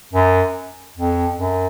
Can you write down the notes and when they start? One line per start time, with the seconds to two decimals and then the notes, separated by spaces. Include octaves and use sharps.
0.13 F#2
0.97 F2
1.39 F#2